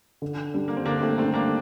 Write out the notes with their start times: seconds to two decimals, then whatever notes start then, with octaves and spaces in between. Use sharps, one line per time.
0.22 D3
0.54 G3 D4
0.68 A#3
0.77 C4
0.86 D3 A#3 D4
1.02 A3 C4
1.18 G3 A3 C4
1.22 D4
1.34 A#3 D4